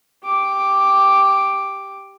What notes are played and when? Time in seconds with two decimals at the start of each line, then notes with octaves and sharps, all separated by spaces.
0.24 G4 D6